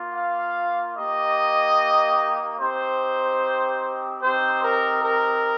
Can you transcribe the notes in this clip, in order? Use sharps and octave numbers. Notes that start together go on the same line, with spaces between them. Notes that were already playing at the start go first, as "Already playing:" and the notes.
Already playing: A#3 F4
F5
A#3 D#4 G4 D#5
C4 D#4 G4 C5
C4 D#4 G4 C5
A#4
A#4